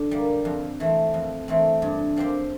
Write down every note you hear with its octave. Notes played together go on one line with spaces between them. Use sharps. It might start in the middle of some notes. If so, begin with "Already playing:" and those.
Already playing: D3
G3 A#3
F2
E3 A3 C4
F2
E3 A3 C4
G2
F3 C4 G4 C5